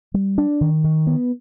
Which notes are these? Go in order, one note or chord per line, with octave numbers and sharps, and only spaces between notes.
G3
D4
D#3
D#3
B3